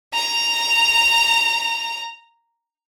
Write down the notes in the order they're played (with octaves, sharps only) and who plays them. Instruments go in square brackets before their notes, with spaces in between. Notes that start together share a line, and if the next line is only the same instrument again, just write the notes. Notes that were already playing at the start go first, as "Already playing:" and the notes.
[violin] A#5 F7